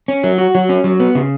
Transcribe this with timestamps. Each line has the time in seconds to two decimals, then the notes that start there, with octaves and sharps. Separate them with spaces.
0.08 C#4
0.24 F#3
0.38 F#4
0.55 F#3
0.69 C#4
0.84 F#3
1.00 B3
1.15 C#3